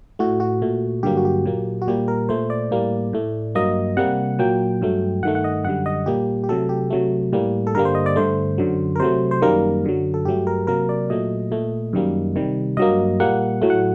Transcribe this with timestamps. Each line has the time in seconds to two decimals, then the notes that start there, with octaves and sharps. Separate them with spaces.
0.19 A2 A3 F#4
0.40 F#4
0.62 A#2 A3
1.03 G2 D3 F#3 A#3 G4
1.17 F#4
1.25 G4
1.45 A#2 F#3 A#3
1.82 F#4
1.88 A#2 G3 A#3 G4
2.08 A#4
2.29 A#2 A3 C5
2.50 D5
2.71 A2 G3 A#3
3.13 A2 A3
3.55 G2 F#3 A#3 D#5
3.97 C3 G3 A#3 F#5
4.39 A#2 F#3 A#3 G5
4.81 G2 F#3 A3
5.23 G2 D#3 A3 F#5
5.35 F#5
5.44 D#5
5.65 F#2 D3 G3 F#5
5.86 D#5
6.06 A#2 G3 A#3 G4
6.44 G4
6.49 C3 F#3 A3 A4
6.69 G4
6.90 C3 F#3 A3
7.33 A2 G3 A#3
7.67 A4
7.75 G2 D3 G3 A#3 A#4
7.85 C5
7.95 D#5
8.06 D5
8.16 G2 D3 A3 C5
8.58 F#2 D3 F#3
8.96 A#4
9.00 C3 F#3 A3 C5
9.31 C5
9.42 F#2 D#3 G3 A#3 A#4
9.85 F#2 D3 F#3
10.14 A4
10.25 G2 F#3 A3 G4
10.47 A#4
10.67 C3 F#3 A#3 A#4
10.89 D5
11.10 A#2 F#3 A3 D#5
11.51 A#2 A3
11.93 F#2 D#3 G3 A#3
12.36 C3 D#3 G3
12.77 G2 F#3 A#3 D#5
13.20 A#2 G3 A#3 F#5
13.62 A2 F#3 A3
13.70 F#5